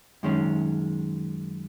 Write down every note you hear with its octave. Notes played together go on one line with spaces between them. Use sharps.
F#2 D#3 G#3 C#4